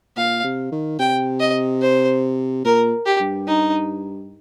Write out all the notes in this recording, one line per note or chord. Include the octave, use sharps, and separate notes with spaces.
A#2 F5
C3
D#3
C3 G5
D#5
C5
A#2 A#4
G4
G2
D#4